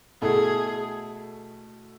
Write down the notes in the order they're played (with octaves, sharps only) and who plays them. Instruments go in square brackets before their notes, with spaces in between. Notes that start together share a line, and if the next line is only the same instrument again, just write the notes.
[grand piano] B2 A3 E4 A4 [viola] G#4